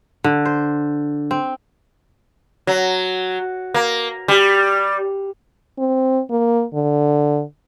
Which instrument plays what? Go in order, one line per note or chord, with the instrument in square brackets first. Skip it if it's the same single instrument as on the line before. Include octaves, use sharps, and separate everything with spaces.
[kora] D3
C5
C4
[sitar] F#3
A#3
G3
[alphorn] C4
A#3
D3